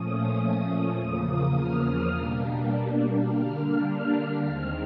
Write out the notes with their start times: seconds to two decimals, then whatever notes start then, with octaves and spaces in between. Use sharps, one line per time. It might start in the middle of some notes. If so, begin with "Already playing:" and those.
Already playing: A#2 F3 A3 C#4 D#6
0.98 E2 C#3 F3 A#3 D#6
1.56 F6
1.84 D#6
2.13 B2 G3 A#3 D4
3.28 D3 G3 A#3 D4 F6
4.43 D#2 D#3 G#3 C4 F6